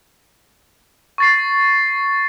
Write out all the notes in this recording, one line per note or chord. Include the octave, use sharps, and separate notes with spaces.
C#6 A6 C7